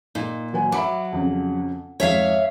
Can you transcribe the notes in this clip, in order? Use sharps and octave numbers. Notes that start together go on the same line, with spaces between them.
A#2 D#4
F#3 B4 G#5
F#3 E5 B5 D6
F2 C#3
F2 G#2 C#5 E5 F5